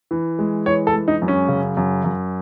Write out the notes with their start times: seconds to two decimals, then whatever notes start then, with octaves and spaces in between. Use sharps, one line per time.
0.11 E3
0.39 G#3
0.66 E3 C#5
0.87 A4
0.94 G#3
1.08 D#4
1.22 F#2
1.28 C#4
1.48 C#3
1.77 F#2
2.04 F#2